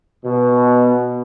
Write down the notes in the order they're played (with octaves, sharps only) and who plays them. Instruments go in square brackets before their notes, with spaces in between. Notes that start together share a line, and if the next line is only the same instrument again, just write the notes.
[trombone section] B2